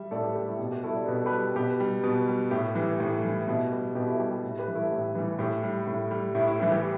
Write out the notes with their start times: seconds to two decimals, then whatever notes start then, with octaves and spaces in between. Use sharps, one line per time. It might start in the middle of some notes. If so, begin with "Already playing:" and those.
Already playing: G3 E5
0.11 A2 A4 D5
0.23 G4 B4
0.35 G3 G4
0.48 E4
0.59 B2
0.72 G4
0.83 G3 E4 A4
0.95 D5
1.06 B2 B4
1.16 A4
1.26 G4 B4
1.32 G3
1.55 B2 G4 B4
1.80 G3
2.04 B2
2.28 G3
2.51 A2 G4
2.75 E3 G3
3.00 A2
3.23 E3 G3
3.48 B2 E4
3.72 G3 G4
3.95 B2 G4
4.07 E4 A4
4.19 G3 G4
4.32 G4
4.44 A2
4.59 G4 B4
4.68 E3 G3
4.75 E4 A4
4.92 A2
5.15 E3 G3
5.39 A2 G4
5.63 G3
5.87 A2
6.11 G3
6.35 A2 E4
6.47 E4
6.59 E3 G3 E4
6.72 G4